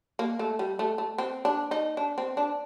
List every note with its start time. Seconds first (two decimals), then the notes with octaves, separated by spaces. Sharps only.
0.19 A#3
0.39 A3
0.59 G3
0.79 A3
0.98 A3
1.18 C4
1.45 D4
1.71 D#4
1.97 D4
2.18 C4
2.37 D4